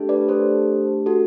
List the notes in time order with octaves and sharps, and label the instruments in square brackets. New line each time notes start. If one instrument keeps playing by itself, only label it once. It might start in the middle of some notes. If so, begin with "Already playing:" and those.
Already playing: [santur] A3 D4 G4
[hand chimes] B4 D5
A4 C5
F#4 A4